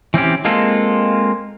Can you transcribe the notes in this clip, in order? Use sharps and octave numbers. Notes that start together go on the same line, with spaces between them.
E3 C4 C#4 G4
G#3 A#3 C4 F4 A4